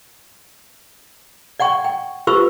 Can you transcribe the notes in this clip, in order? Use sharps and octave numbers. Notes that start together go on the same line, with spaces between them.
D5 F#5 G5 C#6
G5
F4 G4 B4 C5 C#6 E6